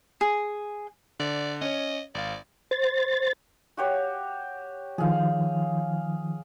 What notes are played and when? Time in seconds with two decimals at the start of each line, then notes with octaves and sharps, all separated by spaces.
0.21 G#4
1.20 D3 D5
1.61 C#4 C#5 D#5
2.15 G#1 D5 F5
2.71 C5 A6
3.77 F#4 G4 C#5
4.98 D#3 F3 G#4 F5